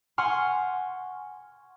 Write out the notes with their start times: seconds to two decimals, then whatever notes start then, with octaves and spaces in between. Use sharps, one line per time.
0.18 F#5 G#5 C6 C#6 F6